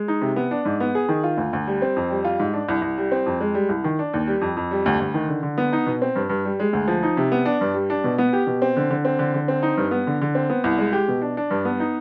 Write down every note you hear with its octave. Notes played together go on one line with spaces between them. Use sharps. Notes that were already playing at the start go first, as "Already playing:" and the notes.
Already playing: G#3
D#4
C3
B3
D4
G#2
B3
G#4
D#3
F4
D2
D2
G3
C4
F2
G3
F4
G#2
D4
C2
C2
G3
C4
F2
G#3
G3
C2
D#3
D4
D#2
G3
F2
F2
G3
D2
D2
D#3
D3
D3
B3
D#4
B2
C4
G2
G2
G3
G#3
D2
F3
D#4
C3
B3
D4
G2
G3
D4
B2
B3
G4
B2
C4
D3
D3
C4
D3
D3
C4
D#4
G2
B3
D3
D3
C4
B3
C2
G#3
G4
B2
D4
D4
G2
B3
D#4